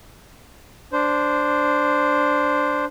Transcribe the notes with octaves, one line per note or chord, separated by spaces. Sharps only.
D4 C5